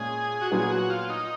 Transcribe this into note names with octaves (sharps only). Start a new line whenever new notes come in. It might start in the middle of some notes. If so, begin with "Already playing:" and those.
Already playing: A#2 G#3 C#4 F4 G#4
F#4
A#2 F#3 B3 G#4
F#4
F4
D#4